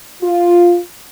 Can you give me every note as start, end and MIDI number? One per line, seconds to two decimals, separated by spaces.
0.22 0.78 65